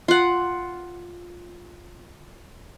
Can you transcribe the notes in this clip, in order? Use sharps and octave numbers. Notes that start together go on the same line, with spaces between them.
F4 F#5